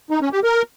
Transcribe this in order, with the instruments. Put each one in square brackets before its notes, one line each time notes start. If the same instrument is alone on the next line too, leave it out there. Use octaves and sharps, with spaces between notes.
[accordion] D#4
C#4
G4
A#4